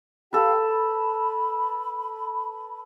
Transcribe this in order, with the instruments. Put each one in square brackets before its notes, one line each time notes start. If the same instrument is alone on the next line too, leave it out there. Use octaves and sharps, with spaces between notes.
[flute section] G4 F5 G5 [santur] A4 B4
[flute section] B5